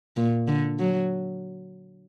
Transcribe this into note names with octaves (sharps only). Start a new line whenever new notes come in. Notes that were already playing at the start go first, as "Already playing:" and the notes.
A#2
D3
F#3